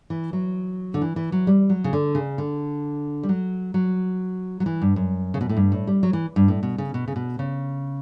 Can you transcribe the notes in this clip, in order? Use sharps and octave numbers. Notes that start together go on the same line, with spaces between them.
E3
F#3
D3
E3
E3
F#3
G3
F#3
C#3
D3
C#3
D3
G3
F#3
F#3
F#3
E3
G2
F#2
C#3
B2
A2
G2
A2
G3
F#3
E3
G2
A2
B2
C#3
B2
C#3
B2
C#3